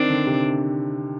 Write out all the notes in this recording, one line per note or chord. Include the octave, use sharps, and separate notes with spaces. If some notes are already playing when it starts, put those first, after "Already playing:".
Already playing: D#3 C4 D4
D3
C3